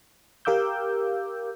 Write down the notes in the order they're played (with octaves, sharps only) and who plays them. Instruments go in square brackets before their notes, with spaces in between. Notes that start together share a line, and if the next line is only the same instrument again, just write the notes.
[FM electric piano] G4 A#4 F5 D6 E6 G6